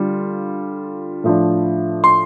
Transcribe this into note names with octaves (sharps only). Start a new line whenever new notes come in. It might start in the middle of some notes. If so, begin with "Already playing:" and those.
Already playing: D3 G3 F4
A2 F3 D4
C6